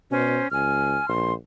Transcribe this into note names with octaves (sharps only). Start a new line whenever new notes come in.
B2 C#4 C5
C#2 G#5 F6
A#1 C6